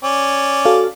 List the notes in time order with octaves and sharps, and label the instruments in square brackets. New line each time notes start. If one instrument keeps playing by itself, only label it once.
[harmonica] C#4 D5
[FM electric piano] F#4 A4 F5